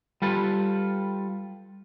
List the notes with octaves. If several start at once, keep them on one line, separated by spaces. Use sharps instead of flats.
G3 F4 A4 B4